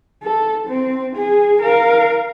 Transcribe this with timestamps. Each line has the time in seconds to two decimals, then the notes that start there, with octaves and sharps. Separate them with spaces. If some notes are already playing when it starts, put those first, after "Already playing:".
0.23 A4
0.67 C4
1.15 G#4
1.62 A#4 F5